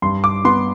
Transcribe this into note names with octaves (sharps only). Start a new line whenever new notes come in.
G2 C6
D6
B3 C6